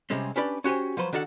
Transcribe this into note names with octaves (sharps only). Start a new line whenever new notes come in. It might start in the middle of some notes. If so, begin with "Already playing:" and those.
C3 G3 G#3 C4 C#4
C#4 D4 G4 B4 D5 B5
C#4 F#4 G4 C5 G#5
F3 F#3 B4 C5
D#3 D4 F#4 A4 E5 F#5